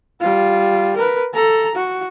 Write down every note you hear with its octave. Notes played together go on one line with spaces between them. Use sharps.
G3 F4
A#4 B4
A4 A#5
F#4